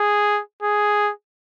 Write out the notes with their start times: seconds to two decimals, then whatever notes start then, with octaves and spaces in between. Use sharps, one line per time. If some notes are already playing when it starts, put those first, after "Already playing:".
Already playing: G#4
0.63 G#4